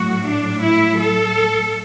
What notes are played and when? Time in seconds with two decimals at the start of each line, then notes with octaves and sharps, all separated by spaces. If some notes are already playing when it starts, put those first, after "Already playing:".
Already playing: A2 F#3 F#4
0.26 D4
0.62 E4
0.98 A4